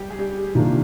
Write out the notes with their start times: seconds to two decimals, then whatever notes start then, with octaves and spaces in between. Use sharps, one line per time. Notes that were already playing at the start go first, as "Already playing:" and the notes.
Already playing: G3 G4
0.10 G#4
0.19 G3 G4
0.55 C3 D#3 A#3 D4 F4